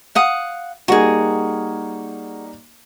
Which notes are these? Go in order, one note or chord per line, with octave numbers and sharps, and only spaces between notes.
F5 F#5 D#6
G3 A#3 D#4 F#4 G#4